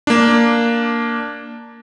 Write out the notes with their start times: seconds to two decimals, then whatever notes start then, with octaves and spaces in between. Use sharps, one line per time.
0.07 A#3 D4